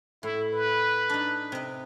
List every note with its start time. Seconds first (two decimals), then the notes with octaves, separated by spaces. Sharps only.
0.23 A2 E4
0.54 B4
1.09 D4 D#4
1.52 C3 D#5